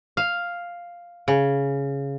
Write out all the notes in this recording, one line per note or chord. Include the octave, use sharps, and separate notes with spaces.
F5
C#3